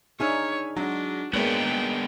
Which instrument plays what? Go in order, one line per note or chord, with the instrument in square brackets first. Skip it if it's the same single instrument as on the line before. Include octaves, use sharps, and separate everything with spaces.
[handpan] D4 D#4 G#4 [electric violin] C#5 [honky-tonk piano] E5 G#5 F6
[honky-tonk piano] F#3 G#3 [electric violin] D4 [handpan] F#4
[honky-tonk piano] G#1 C#5 F#6 [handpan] G#3 A#3 [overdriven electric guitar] B3 D4 [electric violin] G5